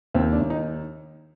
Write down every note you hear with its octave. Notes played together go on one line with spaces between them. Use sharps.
D#2 C4
D4
D#2
D#4